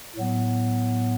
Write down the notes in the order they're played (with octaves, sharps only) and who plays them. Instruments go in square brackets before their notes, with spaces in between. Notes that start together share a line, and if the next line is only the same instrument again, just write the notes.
[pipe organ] A2 F#3 B3